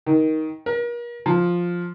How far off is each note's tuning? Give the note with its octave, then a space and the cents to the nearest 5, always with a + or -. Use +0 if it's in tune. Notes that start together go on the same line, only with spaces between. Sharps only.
D#3 +15
A#4 +40
F3 +5